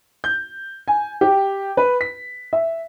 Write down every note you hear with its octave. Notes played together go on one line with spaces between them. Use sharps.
G6
G#5
G4
B4
B6
E5